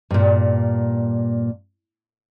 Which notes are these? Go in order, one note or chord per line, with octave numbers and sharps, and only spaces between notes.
G2 A#2